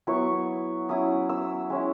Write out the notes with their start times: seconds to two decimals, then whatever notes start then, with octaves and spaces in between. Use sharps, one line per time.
0.07 F#3 B3 E4 C#6
0.89 F#3 C#4 E4 D#6
1.29 E6
1.70 G#3 C#4 E4